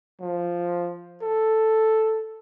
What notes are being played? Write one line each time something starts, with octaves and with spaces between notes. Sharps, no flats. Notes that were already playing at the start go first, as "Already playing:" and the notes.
F3
A4